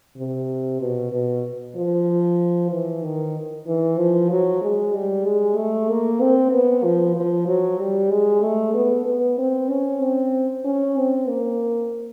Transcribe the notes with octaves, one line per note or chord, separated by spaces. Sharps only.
C3
B2
B2
F3
E3
D#3
E3
F3
F#3
G#3
G3
G#3
A3
A#3
C4
B3
F3
F3
F#3
G3
G#3
A3
B3
B3
C4
C#4
C4
C#4
C4
A#3